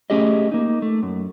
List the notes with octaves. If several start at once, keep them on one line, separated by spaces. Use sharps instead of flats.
A3 C#4 G4 G#4 D#5
A#3 D#4
A3
F#2